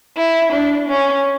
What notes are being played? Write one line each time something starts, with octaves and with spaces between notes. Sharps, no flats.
E4
D4
C#4